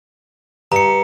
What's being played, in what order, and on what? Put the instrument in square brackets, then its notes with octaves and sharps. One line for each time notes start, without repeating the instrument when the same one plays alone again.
[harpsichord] G2 [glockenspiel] A#5 C#7